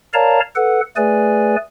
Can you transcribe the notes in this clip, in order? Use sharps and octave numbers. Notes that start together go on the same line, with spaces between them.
A#4 C#5 D5 F5 A5 A#5
A4 B4 F#5
A3 G#4 B4 D5 G#5